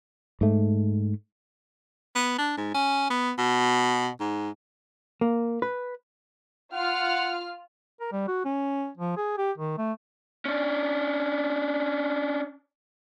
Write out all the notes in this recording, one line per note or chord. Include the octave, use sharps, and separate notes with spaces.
G#2 A3
B3
D4
G#2
C#4
B3
B2
G#2
A#3
B4
F4 F#5 F6
A#4
G3
F#4
C#4
F3
G#4
G4
D#3
A3
C#4 D4